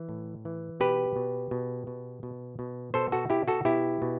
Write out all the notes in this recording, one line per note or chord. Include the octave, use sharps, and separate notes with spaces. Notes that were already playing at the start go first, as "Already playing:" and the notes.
Already playing: E3
A2
E3
B2 G4 B4
B2
B2
B2
B2
B2
B2 A4 C5
F#4 A4
B2 E4 G4
F#4 A4
B2 E4 G4
B2